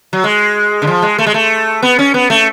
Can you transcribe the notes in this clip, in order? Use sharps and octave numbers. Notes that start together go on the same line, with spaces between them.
F#3
G#3
D3
F3
G#3
A3
G#3
A3
B3
C#4
B3
A3